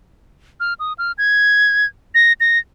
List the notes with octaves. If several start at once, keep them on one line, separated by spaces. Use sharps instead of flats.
F6
D#6
F6
G#6
A#6
A#6